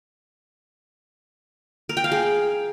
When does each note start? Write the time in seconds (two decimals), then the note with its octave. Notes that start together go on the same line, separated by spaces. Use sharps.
1.89 A#4
1.97 G5
2.04 F5
2.12 G#4